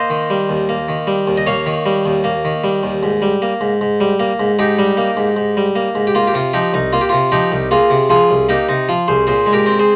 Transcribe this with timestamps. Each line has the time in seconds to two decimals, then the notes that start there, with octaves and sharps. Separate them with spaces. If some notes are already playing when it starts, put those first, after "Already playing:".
Already playing: A#3 C5 D#5
0.10 D#3
0.30 G3
0.49 D#2
0.69 A#3
0.89 D#3
1.07 G3
1.27 D#2
1.37 D#5
1.47 A#3 C#5 F5
1.66 D#3
1.86 G3
2.06 D#2
2.24 A#3
2.45 D#3
2.64 G3
2.83 D#2
3.03 G#2
3.22 G3
3.42 A#3
3.61 G#2
3.81 G#2
4.01 G3
4.20 A#3
4.40 G#2
4.59 G#2 D#4 G4
4.79 G3
4.97 A#3
5.17 G#2
5.36 G#2
5.57 G3
5.76 A#3
5.95 G#2
6.07 G4
6.15 A#3 F4
6.27 G4
6.34 C3 F4
6.53 F3 D#4 G4
6.74 C2 D#4
6.93 A#3 F4
7.01 G4
7.09 C3 F4
7.32 F3 D#4 G4
7.52 C2
7.71 A#3 F4 G#4
7.90 C3
8.10 F3 F4 G#4
8.30 C2
8.49 A#3 D#4 G4
8.69 C3 D#4
8.89 F3 F4
9.08 C2 G#4 C5
9.27 A#2 G#4 C5
9.47 G#3
9.53 G4 A#4
9.66 C4
9.79 G#4 C5